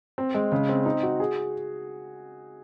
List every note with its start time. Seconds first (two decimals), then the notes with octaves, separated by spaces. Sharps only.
0.18 C4
0.34 G#3
0.52 C#3
0.69 C4
0.85 D#4
1.03 F#4
1.20 G#4